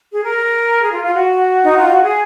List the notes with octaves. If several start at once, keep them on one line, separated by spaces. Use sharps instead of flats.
G#4
A#4
G#4
F4
F4
F#4
D#4
F4
F#4
G#4